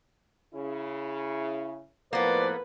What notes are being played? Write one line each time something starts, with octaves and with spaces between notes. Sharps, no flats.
C#3 E4
A2 F3 A#3 B3 A4 B4 C5 D5